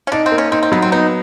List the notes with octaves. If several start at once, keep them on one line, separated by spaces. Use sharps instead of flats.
C#4
D4 D#4
C4
A#3
C#4
C4 D#4
C4
F#3 B3
C4
B3 D#4